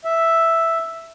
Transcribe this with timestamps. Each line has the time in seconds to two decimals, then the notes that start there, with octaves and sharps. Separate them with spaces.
0.05 E5